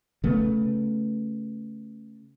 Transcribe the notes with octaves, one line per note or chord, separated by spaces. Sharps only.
C#3 A3 B3